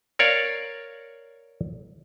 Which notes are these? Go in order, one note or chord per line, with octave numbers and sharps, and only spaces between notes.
A#4 C#5 D5 F5